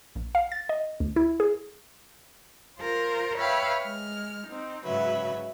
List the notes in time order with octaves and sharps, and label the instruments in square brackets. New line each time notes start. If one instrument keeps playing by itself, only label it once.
[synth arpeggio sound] A#1
F5
A6
D#5
D2
E4
G#4
[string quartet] F4 A#4 C5
B4 C#5 E5 F5 G5
G#3 F6
C4 D#4
G#2 C#3 F#3 B4 E5